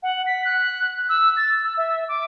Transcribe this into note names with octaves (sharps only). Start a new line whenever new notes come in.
F#5
B6
F#6
E6
A6
E6
E5
D6